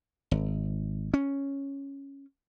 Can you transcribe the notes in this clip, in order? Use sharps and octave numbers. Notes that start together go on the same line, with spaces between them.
G#1
C#4